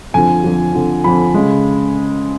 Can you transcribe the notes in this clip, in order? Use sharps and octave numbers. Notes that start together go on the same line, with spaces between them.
F2 D3 F3 G#5
F2 D3 F3
F2 D3 F3
F2 D3 F3 B5
C#3 G#3